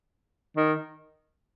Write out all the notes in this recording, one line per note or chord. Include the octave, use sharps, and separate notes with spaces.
D#3